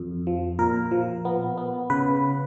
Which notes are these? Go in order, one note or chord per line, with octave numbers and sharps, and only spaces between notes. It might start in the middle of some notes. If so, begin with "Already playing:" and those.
Already playing: F2
F3
A#2 A#4
F3
B3
B3
C#3 B4